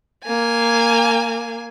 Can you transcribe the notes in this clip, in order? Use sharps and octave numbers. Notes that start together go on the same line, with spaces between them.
A#3 G#5